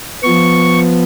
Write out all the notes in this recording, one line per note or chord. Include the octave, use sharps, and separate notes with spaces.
F3 B3 C#6